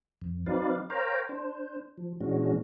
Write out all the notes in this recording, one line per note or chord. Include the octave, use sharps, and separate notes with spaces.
F2
F#3 C4 D#4 B4 D5 F5
A#4 C5 C#5 F5 G5 A#5
D4 C5
F3
A#2 E3 G#3 C#4 D4 F#4